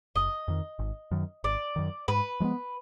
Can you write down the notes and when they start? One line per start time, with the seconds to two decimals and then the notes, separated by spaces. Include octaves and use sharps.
0.16 F#1 D#5
0.48 F2 D#3
0.79 G#1
1.11 F#2 D#3
1.44 G#1 D5
1.76 F#2 D#3
2.08 G#2 B4
2.40 F3 G#3 B3